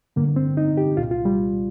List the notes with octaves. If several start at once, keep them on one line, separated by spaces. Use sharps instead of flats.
G2 D3 A#3
C4
D#4
G4
C2 A#2 F4
F4
G3